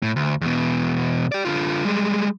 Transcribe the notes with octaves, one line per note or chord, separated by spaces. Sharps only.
A2
D2
E2 B2
G4 D5
D3 F4
G3 G#3